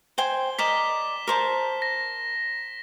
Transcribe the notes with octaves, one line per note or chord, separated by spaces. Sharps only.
C5 G5 G#5 G7
A#4 D5 D#5 B6 E7
A#4 C5 A5
A#6